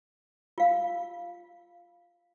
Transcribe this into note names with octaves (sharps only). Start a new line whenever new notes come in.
F4 F5